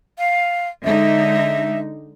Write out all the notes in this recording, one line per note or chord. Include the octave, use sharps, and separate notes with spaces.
F5
D3 G#3 D#4 E5